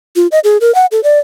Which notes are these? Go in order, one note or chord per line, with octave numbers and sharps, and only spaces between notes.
F4
D#5
G#4
A#4
F#5
A4
D5